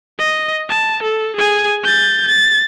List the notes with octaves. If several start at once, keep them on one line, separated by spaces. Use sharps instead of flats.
D#5
A5
A4
G#4 G#5
G6 A6
A6